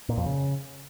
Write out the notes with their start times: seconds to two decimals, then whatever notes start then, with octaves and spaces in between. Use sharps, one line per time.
0.09 A#2
0.17 F2
0.26 C#3